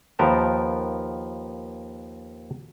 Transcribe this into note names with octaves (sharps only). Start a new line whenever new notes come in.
D#2 F3 B3 A#4 G5 A5